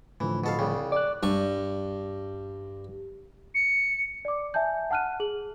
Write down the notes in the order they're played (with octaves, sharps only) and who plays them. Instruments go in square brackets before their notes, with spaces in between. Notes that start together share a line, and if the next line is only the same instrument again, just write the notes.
[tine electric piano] A2 D3 F3 [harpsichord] E3
[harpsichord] B2 A4 F5
C2 C#3 G3
[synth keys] D5 [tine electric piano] D6 F#6
[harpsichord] G2 C#6
[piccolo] C#7
[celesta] D5 D6
E5 G#5 A5 G6
F#5 A5 F6 F#6 D#7
G#4 F#7